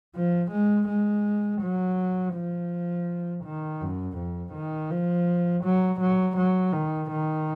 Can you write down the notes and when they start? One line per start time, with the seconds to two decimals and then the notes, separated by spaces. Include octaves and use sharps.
0.16 F3
0.51 G#3
0.88 G#3
1.61 F#3
2.35 F3
3.44 D#3
3.80 F#2
4.17 F2
4.54 D#3
4.90 F3
5.64 F#3
6.00 F#3
6.37 F#3
6.73 D#3
7.10 D#3